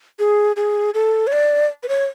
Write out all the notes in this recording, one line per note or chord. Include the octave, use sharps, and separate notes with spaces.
G#4
G#4
A4
C#5
D5
B4
C#5